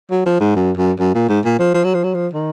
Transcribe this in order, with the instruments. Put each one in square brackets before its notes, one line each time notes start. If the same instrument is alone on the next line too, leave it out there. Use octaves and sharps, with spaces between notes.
[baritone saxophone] F#3
F3
G#2
F#2
F#2
F#2
A#2
G#2
A#2
F3
F3
F#3
F3
F#3
F3
D#3